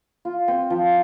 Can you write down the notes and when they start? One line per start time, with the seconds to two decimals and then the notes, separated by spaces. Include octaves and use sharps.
0.25 F4
0.48 C4
0.70 F3